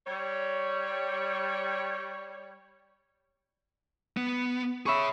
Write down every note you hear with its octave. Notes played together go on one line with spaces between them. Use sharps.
G3 C#5
B3
G#4 C#5 E5 B5 C#6